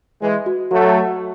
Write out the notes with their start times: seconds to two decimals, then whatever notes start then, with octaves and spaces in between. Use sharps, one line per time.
0.22 E3 G#3 D#5
0.46 F#4
0.71 F#3 A3 F#4